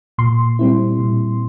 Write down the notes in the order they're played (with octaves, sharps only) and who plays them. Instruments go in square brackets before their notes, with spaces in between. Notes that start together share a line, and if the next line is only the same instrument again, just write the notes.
[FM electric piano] A#2 C6
G3 C4 E4
A#2